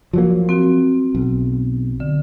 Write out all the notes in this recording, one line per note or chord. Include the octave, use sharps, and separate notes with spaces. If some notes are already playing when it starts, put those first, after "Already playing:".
F3 F#3 A#3
C4 F#4
B1
D3